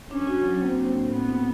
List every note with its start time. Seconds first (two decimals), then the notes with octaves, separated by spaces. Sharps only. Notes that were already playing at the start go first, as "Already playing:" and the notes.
0.10 C#4 D4
0.27 F#4
0.44 F#3
0.62 A#3 C4
0.78 D4
0.95 A2
1.12 B3 C4
1.29 E4